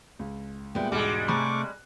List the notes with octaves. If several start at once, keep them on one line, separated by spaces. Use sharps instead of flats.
C#2
A#2 G3 G#3 B3 E4 G5
E1 G#2 G3 G#3 F#4 D#5 D6
C3 A3 G#4 A#5 B5 C#6 D6 F#6